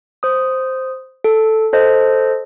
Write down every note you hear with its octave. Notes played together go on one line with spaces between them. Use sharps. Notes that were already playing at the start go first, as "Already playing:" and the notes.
C5 D#6
A4
A4 C5 D#5